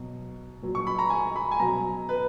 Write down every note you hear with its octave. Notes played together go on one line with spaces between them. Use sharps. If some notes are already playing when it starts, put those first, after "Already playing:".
Already playing: B2 F#3
A#2 F#3
C#6
B5
A#5
G#5
B5
G#5
B2 F#3 A#5
B4